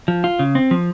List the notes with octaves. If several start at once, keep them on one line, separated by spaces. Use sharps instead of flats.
F3
F4
C#3
C4
F3